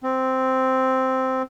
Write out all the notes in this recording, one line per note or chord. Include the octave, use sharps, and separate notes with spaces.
C4